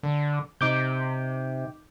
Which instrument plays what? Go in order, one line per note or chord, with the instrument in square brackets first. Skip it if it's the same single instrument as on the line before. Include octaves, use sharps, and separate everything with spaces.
[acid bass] D3
[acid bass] C3 [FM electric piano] D#4 D6 G6